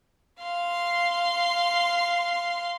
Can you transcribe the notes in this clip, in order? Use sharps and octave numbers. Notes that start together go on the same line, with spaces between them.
F5 C6